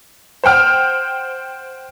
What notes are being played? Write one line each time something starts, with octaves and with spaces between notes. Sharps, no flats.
C5 F#5 G5 F6